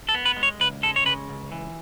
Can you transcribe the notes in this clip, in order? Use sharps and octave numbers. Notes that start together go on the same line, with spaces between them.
A4
B3
B4
G#3
C#5
C#2 B4
G#3 A4
C#5
C#3 B4
C#2
E3